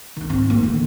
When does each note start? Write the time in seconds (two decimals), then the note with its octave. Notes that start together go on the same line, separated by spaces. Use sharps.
0.17 D#3 D4
0.29 G#2 C4
0.50 A2 A#3
0.63 E2 D3